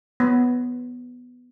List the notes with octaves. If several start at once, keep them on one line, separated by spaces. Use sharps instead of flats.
B3